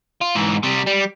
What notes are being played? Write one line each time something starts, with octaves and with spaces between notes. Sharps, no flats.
F4
G#2 E3
C3 G3
G3